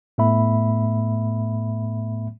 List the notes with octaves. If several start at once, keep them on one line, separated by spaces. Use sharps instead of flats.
A2 A3 B3 E5 B5